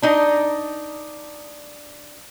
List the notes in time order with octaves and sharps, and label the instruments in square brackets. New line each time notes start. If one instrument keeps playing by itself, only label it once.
[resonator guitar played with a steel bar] D4 D#4 D#5